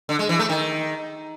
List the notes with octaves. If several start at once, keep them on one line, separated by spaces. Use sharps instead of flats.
D3
G#3
E3
A3
D#3